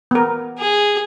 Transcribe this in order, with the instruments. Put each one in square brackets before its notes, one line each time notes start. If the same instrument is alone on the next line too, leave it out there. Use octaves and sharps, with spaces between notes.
[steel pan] B3 A#4
[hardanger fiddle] G#4